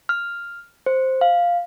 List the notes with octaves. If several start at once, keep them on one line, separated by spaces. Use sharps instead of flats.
F6
C5
F5